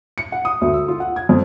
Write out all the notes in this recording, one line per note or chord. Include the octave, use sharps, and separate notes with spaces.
C#7
F#5
D#6
D2
E6
F4
F#5
G#6
F2